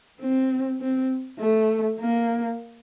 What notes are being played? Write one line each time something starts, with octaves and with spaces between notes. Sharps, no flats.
C4
C4
A3
A#3